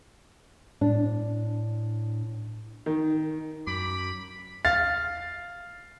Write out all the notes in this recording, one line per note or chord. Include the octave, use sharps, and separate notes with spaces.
A2 D4
D#3
F#2 B5 D6
F5 A6